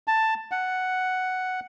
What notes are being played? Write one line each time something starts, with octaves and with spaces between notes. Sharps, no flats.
A5
F#5